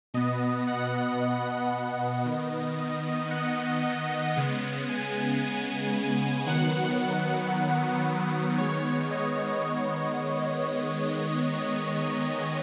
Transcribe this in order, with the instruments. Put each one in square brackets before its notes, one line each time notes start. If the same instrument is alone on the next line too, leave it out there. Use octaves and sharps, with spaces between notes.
[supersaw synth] B2 B3 D#5
F#5
D#5
D#3 B3
D#5
F#5
C#3 G#3 B3
G#5
D#3 F#3 B3 F#5
F#5
D#3 G#3 B3 C#5
D#5